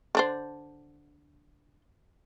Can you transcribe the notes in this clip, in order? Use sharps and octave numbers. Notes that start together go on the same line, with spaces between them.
D3 D4 C5